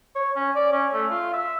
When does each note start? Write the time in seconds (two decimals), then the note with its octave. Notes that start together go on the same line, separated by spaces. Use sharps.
0.15 C#5
0.36 C#4
0.56 D5
0.73 C#4
0.93 A3
1.11 F4
1.33 E5